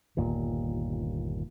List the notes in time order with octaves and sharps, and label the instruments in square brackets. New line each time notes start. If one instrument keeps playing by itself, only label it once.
[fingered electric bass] G1 D#2 A#2